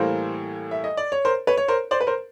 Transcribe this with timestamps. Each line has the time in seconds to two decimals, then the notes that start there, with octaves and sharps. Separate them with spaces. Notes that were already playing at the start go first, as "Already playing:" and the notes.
Already playing: A2 E3 G3 A#3 A#4 C5
0.71 E5
0.84 D#5
0.97 D5
1.12 C#5
1.25 A#4 C5
1.47 B4 C#5
1.57 C#5
1.68 A#4 C5
1.91 C5 D5
2.00 B4
2.07 A#4 C5